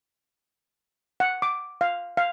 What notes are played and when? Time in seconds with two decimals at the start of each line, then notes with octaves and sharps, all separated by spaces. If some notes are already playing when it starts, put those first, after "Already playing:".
1.20 F#5
1.42 D6
1.81 F5
2.17 F5